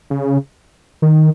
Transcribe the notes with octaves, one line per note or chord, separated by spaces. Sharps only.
C#3
D#3